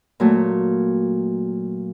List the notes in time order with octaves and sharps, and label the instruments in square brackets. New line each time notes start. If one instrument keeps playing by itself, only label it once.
[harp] A#2 F#3 A3